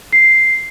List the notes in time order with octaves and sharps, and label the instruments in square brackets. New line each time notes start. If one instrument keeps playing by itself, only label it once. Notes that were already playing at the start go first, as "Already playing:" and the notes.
[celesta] C7